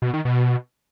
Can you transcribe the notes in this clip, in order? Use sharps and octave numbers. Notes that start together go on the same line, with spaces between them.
B2
D#3
B2